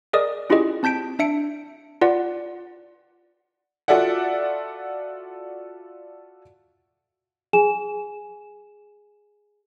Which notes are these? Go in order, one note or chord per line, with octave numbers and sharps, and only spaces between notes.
G#4 A#4 D5 D#5 D#6
C#4 E4 F4 G4 G#4 D#5
C4 A5 G6 B6 D7
D4 E5 C#7 D7
F4 B4 D5 F#5
F4 F#4 A4 D5 E5 F#5
G#4 G#5 E7